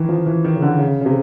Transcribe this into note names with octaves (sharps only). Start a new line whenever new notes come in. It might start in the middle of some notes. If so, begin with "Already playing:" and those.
Already playing: D#3 E3
F3
E3
D#3
C#3
D3
C#3
C#3
C3